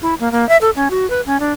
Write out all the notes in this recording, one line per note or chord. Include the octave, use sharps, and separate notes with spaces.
E4
A#3
A#3
E5
A4
C#4
F#4
B4
C#4
D4